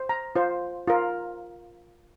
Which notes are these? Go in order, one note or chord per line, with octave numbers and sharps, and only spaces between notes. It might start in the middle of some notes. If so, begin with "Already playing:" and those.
Already playing: C5
A#5
F4 C5
F4 A#4